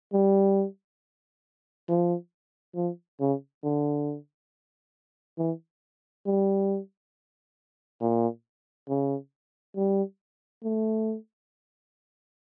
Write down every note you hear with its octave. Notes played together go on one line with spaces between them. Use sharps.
G3
F3
F3
C#3
D3
E3
G3
A#2
C#3
G3
A3